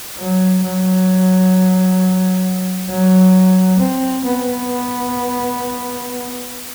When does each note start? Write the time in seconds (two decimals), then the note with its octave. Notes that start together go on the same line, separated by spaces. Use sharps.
0.18 F#3
0.63 F#3
2.89 F#3
3.80 C4
4.25 B3